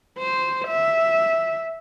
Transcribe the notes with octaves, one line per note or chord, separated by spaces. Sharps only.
C5
E5